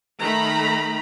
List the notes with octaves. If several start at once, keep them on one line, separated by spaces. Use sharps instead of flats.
D#3 A3 A#5 B5